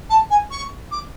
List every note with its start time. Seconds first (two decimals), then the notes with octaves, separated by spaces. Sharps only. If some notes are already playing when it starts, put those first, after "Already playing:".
0.09 A5
0.30 G#5
0.51 C#6
0.91 D6